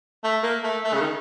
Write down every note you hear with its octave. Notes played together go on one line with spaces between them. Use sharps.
A3
A#3
A3
A3
C#3
D#3